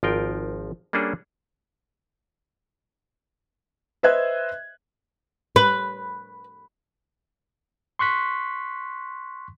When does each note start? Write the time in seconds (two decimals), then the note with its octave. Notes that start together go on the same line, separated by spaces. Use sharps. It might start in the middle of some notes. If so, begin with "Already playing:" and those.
0.03 G#1 F3 F4 A#4 G5
0.93 G3 A#3 C#4 D4 G#4 A4
4.03 B4 C5 D#5 E5 F#6 G#6
5.56 B4
7.99 C6 C#6 F#6 B6